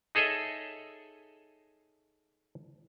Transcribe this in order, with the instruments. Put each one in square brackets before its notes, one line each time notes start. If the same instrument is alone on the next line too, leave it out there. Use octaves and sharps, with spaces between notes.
[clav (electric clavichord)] D#4 G#4 A4 C#5 D#5 E5